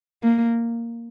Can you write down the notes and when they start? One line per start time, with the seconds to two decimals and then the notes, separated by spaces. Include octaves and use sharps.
0.23 A#3